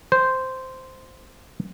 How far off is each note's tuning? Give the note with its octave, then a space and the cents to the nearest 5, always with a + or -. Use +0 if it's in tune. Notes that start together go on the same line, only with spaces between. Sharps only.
C5 -5